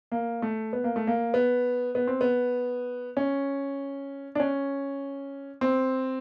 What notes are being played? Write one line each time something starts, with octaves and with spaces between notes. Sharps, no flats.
A#3
A3
B3
A#3
A3
A#3
B3
B3
C4
B3
C#4
D4
C#4
C4